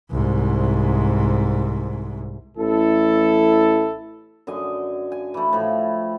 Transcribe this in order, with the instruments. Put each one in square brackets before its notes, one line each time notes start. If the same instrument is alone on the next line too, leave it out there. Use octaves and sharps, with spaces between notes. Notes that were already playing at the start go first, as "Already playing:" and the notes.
[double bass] C2 G#2
[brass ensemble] A1 E4 A4
[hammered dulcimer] F#2 D3 D#5 G#5
G#5
E3 A3
A2 F3 B5